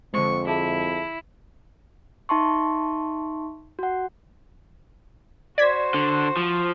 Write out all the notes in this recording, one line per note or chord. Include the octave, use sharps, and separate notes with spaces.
F2 D3 G#3 C5 C#6
E4 G#4 E5 A5
D#4 E5 A5 C6 C#6
F#4 F#5
F#4 C5 D5 G#6 B6
D3
F3